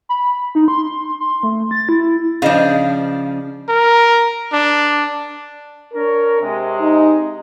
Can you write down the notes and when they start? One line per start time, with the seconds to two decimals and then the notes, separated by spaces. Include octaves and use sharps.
0.09 B5
0.55 D#4
0.68 C6
1.20 C6
1.43 A3
1.71 A6
1.89 E4
2.42 C#3 F3 D4 D#5 F5
3.69 A#4
4.53 D4
5.93 D4 A#4 C#5
6.41 C3 G#3
6.81 D#4